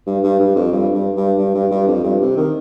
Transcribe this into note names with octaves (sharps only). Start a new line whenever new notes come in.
G2
G2
G2
F2
G2
G2
G2
G2
G2
G2
F2
G2
C3
D#3